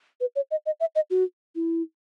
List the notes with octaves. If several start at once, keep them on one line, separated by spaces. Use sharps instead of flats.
B4
C#5
D#5
D#5
E5
D#5
F#4
E4